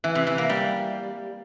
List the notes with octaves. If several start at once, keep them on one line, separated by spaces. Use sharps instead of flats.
E3
C3
E3
A#3
G3